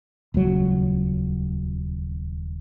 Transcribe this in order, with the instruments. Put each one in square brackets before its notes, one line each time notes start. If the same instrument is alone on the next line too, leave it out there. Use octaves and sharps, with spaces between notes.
[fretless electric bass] D#1 C#2 F#3